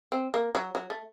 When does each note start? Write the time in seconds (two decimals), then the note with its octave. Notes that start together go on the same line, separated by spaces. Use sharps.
0.12 C4
0.34 A#3
0.55 F#3
0.75 F#3
0.90 A3